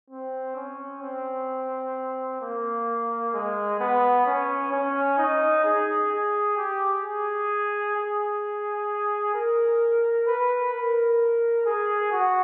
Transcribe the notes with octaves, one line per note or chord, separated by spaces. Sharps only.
C4
C#4
C4
A#3
G#3
B3
C#4
C#4
D#4
G#4
G#4
G4
G#4
G#4
A#4
B4
A#4
G#4
F#4